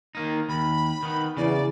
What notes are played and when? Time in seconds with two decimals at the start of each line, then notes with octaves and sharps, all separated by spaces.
0.15 D#3 A#3 D#4
0.49 D#2 B5
1.03 D#3 B3
1.37 E2 C#3 D5